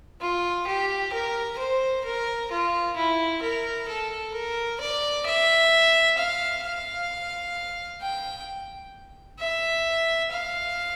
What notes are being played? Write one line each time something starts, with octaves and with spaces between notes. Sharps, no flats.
F4
G4
A#4
C5
A#4
F4
E4
A#4
A4
A#4
D5
E5
F5
F5
G5
E5
F5